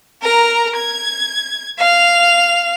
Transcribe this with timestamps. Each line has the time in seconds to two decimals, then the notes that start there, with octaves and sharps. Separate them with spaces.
0.22 A#4 A#5
0.76 G#6
1.78 F5 F7